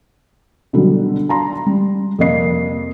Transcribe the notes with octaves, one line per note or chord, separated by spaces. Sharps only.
B2 D3 D#3 F#3 G3
A5 A#5 C6
G3
F2 C3 A#3 D#5 C7